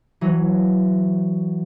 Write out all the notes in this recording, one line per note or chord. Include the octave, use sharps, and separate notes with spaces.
E3 F#3